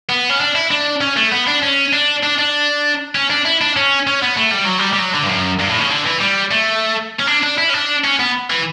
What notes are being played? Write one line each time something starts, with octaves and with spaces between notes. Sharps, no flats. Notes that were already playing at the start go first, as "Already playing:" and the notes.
B3
C#4
D4
E4
D4
C#4
A3
B3
D4
C#4
D4
D4
D4
C#4
D4
E4
D4
C#4
C#4
B3
A3
G3
F#3
G3
G3
F#3
D3
G2
F#2
G2
A2
C#3
D3
E3
G3
A3
C#4
D4
D4
E4
C#4
D4
C#4
B3
E3